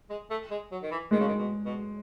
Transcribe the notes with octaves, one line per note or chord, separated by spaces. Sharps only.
G#3
A3
G#3
F#3
D#3
E3
D#3 G#3
C#3
D#3
B2
B2